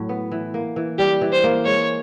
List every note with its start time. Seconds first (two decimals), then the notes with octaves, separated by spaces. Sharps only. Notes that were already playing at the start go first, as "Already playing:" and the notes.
Already playing: A2 F#3
0.09 B3
0.31 E3
0.54 A#3
0.76 E3
0.99 G3 G4
1.21 E3
1.33 C5
1.44 A#3
1.65 G#3 C#5